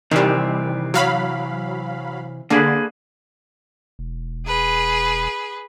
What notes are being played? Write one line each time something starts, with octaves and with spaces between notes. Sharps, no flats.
C3 D#3 E3 G3 C4
F#3 F5 B5
D3 A#3 G#4 B4
E1
G#4 B4